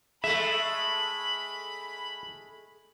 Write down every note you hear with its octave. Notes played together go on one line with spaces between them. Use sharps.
G#3 A3 E5 B5